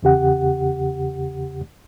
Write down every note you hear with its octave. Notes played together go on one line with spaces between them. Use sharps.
E2 C#3 G4 F#5